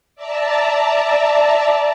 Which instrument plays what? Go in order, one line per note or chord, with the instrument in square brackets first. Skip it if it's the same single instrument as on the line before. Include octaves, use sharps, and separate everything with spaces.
[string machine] D5 E5 A5 A#5